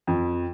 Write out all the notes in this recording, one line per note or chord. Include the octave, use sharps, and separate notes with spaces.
F2